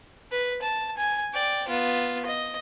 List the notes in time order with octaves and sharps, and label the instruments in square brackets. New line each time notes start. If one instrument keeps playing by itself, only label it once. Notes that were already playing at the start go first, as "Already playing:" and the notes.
[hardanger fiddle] B4
A5
G#5
D5 G5
B3 F4
D#5